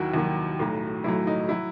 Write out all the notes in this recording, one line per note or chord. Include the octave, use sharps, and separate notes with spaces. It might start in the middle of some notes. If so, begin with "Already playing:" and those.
Already playing: D#2 D#3 F#3 E4 F#4
D#2 D#3 F#3
B1 A2 F#3
B1 A2 F#3 E4
D#4
F#3 E4